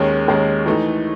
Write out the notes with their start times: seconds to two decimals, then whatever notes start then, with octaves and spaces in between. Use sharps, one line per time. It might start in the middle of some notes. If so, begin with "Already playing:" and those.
Already playing: D#2 D#3 G#3 C#4
0.28 D#2 D#3 G#3 C#4
0.66 E3 A3 D#4